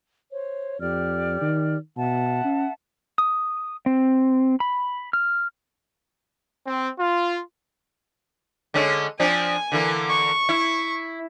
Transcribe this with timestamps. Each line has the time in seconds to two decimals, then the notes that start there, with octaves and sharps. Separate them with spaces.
0.32 C5 C#5
0.80 F2 G4 D5 F6
1.41 D#3
1.97 B2 E5 F#5 A5
2.44 C#4
3.18 D#6
3.86 C4
4.60 B5
5.13 F6
6.63 C4
6.97 F4
8.74 D3 G#3 C#4
9.20 F3 C4 D4 G#5
9.72 D3 E3 A#3
10.10 C#6
10.49 E4